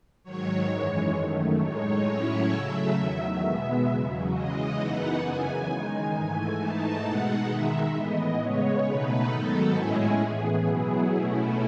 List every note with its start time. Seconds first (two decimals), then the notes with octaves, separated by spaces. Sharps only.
0.24 G#2 D#3 F#3 C#5
0.69 F#2 E3 G#3
1.15 F#2 D#3 A3
1.59 A2 G#3 D#4 C#5
2.05 A2 F#3 C#4 E4
2.50 C#3 F#3 A3 E5
2.96 E2 D#3 F#3
3.41 B2 G#3 B3
3.85 E2 C#3 F#3
4.31 C#3 E3 G#3 D#5
4.76 F#2 E3 B3 D#4 F#5
5.22 F#2 C#3 E3 B3 G#5
5.67 D#3 G#3 D#4 G#5
6.12 G#2 E3 A3
6.57 G#2 E3 A3 D#4 A5
7.02 B2 G#3 D#4 F#5
7.48 D#3 G#3 D#4 E5
7.93 A2 E3 B3 E4 D#5
8.38 C#3 G#3 B3 C#5
8.83 B2 A3 D#4 B4
9.28 G#2 D#3 F#3 B3 D#4 A4
9.74 A2 G#3 C#4 E4 G#4
10.19 A2 E3 B3 G#4
10.65 B2 F#3 B3 E4
11.10 B2 A3 C#4 E4